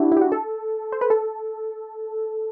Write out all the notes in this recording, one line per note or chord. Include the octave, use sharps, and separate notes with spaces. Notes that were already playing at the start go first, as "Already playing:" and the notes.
Already playing: D4 E4 F#4 G4
E4 G4
F#4
A4
C5
B4
A4